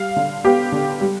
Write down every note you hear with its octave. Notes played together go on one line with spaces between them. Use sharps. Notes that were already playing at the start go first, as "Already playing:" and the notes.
Already playing: G3 F5
D3
B3 G4
D3
G3